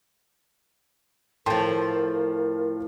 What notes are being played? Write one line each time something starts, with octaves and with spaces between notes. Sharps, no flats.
A2 F3 A#4 G5 A5 C6